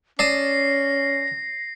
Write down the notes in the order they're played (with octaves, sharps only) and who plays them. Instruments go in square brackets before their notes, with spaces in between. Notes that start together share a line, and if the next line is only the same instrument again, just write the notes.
[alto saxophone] C#4 [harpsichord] D5 A5 D#6 [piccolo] A#6 [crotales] C7